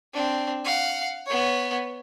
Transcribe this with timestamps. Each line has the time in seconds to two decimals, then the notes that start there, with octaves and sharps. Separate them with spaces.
0.14 C4 D4
0.65 F5 F#5
1.26 B3 C#5